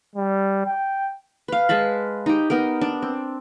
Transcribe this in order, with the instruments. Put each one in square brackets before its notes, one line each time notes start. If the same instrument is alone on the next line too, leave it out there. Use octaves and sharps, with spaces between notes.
[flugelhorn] G3
G5
[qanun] B4 F5
G#3 B4 A5 B5
D#4 G4
B3 D#4 A#4
D4
C4